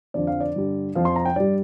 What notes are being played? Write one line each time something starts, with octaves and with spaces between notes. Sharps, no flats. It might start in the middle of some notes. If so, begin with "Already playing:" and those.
F2 D3 F3 D5
F5
D5
G2 D3 G3
F2 F3 F5
C6
A#5
G5
G2 G3 D5